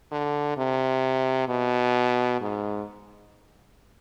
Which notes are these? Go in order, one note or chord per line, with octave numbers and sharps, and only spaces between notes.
D3
C3
B2
G#2